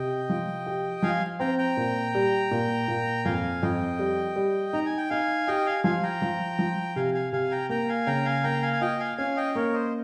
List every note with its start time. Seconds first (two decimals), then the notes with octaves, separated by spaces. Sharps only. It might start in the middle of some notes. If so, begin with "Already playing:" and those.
Already playing: C3 D#5 G5
0.29 F3
0.66 G4
1.02 F3 F5 G#5
1.40 C4 G5 A#5
1.58 G5 A#5
1.77 A#2
2.15 G3
2.51 A#2
2.88 A#2
3.25 F2 F5 G#5
3.63 F2 D#5 G5
3.99 G3
4.36 G3
4.73 D#4 A#5
4.86 G#5
4.97 G5
5.10 D#4 F5 G#5
5.47 G4 D#5 G5
5.66 F5 G#5
5.84 F3 F5 G#5
6.03 G5 A#5
6.22 F3
6.59 F3
6.96 C3 F5 G#5
7.14 F5 G#5
7.33 C3 F5 G#5
7.51 G5 A#5
7.69 A#3 G5 A#5
7.89 F5 G#5
8.06 C#3 G5 A#5
8.25 F5 G#5
8.44 A#3 G5 A#5
8.62 F5 G#5
8.73 G#5
8.81 F4 D#5 G5
9.00 F5 G#5
9.18 C#4 F5 G#5
9.37 D#5 G5
9.55 A#3 A#4 C#5
9.73 C5 D#5